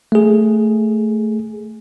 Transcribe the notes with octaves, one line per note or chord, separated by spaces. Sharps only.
A3 G#4